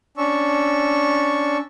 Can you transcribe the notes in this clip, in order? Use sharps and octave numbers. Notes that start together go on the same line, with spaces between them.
C#4 D4 C#6 E6